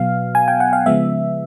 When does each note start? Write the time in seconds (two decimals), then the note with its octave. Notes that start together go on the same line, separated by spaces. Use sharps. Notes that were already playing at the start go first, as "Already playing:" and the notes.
Already playing: B2 F#3 B3 F5
0.35 G#5
0.48 G5
0.60 F#5
0.73 F5
0.86 C#3 F3 G#3 B3 E5